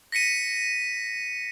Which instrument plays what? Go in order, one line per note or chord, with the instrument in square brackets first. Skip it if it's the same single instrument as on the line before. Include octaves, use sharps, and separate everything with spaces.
[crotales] A#6 B6 C#7 D#7